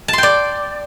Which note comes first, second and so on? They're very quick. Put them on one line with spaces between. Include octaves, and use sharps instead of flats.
A5 C6 G5 D5